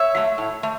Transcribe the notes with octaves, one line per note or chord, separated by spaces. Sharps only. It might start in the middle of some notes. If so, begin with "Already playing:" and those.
Already playing: C#5 E5
F#3 A3
A2
A3